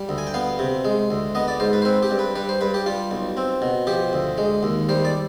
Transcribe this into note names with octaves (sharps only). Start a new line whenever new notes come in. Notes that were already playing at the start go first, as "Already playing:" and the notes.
Already playing: G3
D2
G#5
G5
B3 F5
C3
G#3
D2
B3 D#5
D5
G#2 C5
B4
C5
C4 B4
G4
G2
B4
G3 B4
C5
G2 B4
G4
G3 F4
B1
C4
B2
F3 G4
D2
G#3
D#2
G3 C5
D5